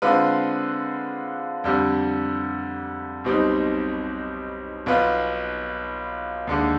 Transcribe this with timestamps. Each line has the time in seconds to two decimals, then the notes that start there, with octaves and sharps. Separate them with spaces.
0.02 D3 G#3 C4 F4 B4
1.64 F2 D3 G3
3.24 B1 B2 G3 C4 D#4
4.86 B1 B2 B3 F4 B4
6.47 D#2 D3 G#3